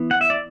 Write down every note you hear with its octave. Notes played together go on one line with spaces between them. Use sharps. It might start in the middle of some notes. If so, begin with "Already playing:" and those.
Already playing: E3 B3
F#5
E5
D5